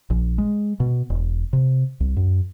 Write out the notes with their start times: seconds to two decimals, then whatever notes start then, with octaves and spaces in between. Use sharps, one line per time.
0.10 A#1
0.38 G#3
0.80 B2
1.10 E1
1.53 C3
2.00 C2
2.17 F#2